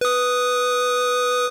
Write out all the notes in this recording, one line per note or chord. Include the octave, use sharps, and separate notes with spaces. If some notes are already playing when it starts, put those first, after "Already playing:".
B4 D#6